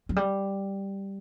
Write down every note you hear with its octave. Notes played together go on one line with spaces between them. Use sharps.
F#3
G3